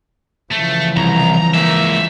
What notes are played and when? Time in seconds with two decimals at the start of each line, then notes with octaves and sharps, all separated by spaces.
0.52 C#3 E3 F3 A3
0.97 C2 A#5
1.54 G#3 A#3 E5